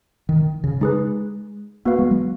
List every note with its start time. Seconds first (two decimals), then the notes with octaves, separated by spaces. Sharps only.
0.29 D#3
0.64 C#3
0.81 G#3 D#4 G#4 B4
1.85 A#3 B3 F#4 B4 F5
1.99 G#3
2.11 F#3